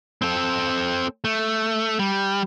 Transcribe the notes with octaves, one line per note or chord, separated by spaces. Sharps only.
C4 A4
A3
G3